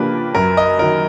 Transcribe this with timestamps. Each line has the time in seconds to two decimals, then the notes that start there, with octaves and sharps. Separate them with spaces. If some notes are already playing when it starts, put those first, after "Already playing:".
Already playing: C#3 F3 A#3 D4 G4 B4
0.35 F#2 A#4
0.57 D#5
0.79 D#3 F#3 A#4